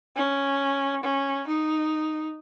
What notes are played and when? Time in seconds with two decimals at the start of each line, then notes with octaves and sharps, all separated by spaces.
0.16 C#4
1.03 C#4
1.47 D#4